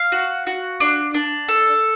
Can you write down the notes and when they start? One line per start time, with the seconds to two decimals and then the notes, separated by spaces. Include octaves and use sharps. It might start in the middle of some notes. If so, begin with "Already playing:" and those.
Already playing: F5
0.12 F#4
0.47 F#4
0.80 D4
1.14 D4
1.48 A4